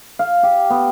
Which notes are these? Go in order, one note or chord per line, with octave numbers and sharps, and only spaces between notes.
F5
G4
B3